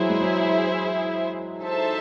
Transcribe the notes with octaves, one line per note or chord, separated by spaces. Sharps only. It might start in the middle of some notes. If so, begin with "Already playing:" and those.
Already playing: E3 F#3 E4 G#4 C5 E5
G#3
F#3
D#4 A4 C5 E5 A5